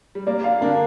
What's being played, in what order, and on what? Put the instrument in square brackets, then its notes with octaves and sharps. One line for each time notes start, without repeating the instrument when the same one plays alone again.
[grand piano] G3
[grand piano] A#3 [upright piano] D5
[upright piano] F5
[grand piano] D3 D4 [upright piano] A#3